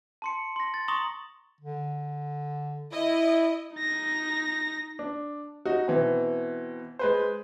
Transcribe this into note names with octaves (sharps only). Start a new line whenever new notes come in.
A5 C6 C#7
C6 A#6
A6
A#5 C6 C#6 D#6 A#6 F#7
D3
E4 D#5
D#4 A#6
D4
D#4 F#4
B2 E3 C4
G#3 B4 C5